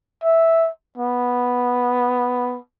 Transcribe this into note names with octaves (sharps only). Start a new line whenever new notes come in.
E5
B3